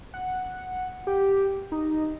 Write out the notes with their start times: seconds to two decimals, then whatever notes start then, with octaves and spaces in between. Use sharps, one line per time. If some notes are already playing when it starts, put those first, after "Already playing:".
0.14 F#5
1.07 G4
1.72 D#4